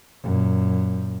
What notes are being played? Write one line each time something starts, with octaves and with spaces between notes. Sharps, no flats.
F#2 A#2